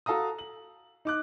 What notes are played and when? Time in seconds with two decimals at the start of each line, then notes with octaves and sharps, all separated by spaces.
0.06 F#4 A4 F5 A#5 D#6
0.38 F#7
1.05 D#4 D6 F#6